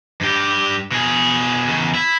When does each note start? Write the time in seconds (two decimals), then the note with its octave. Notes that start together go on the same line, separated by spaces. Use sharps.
0.21 G2 G4
0.91 B2 G#4
1.69 E2 C#3
1.94 E4